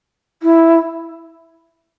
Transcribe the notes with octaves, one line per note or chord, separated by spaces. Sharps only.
E4